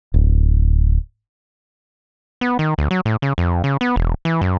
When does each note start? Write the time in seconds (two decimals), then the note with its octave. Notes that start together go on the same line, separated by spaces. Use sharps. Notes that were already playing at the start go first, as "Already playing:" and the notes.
0.14 D1
2.41 B3
2.59 D#3
2.78 D2
2.91 F#3
3.05 A2
3.22 C#3
3.38 F2
3.64 C#3
3.81 B3
3.96 E1
4.25 E3
4.41 F#2